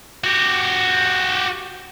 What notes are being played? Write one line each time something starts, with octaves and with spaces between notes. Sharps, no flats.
F#4 G4